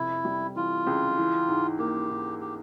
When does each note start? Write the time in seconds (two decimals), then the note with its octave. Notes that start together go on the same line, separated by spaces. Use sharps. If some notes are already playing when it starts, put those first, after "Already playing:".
Already playing: F2 C3 E4
0.25 G3
0.56 E3 F4
0.87 C#2
1.18 E3
1.48 G#2
1.79 A#3 G4
2.10 G#2
2.41 G4